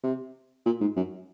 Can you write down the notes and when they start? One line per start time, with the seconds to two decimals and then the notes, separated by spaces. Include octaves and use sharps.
0.04 C3
0.66 A#2
0.80 G#2
0.96 F#2